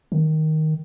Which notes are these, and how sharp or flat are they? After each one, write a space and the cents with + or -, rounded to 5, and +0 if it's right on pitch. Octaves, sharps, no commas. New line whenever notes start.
D#3 +5